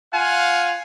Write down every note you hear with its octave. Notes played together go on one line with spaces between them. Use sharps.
F4 F5 F#5 G#5